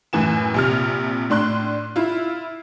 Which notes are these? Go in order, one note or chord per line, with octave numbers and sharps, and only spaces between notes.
F#2 A2 E3 G#5 E7
A#1 C3 F6
A2 D4 C6 F#6
E4 F4